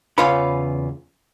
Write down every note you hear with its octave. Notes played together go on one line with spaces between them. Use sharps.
E2 C#3 F4 B4 C#5 B5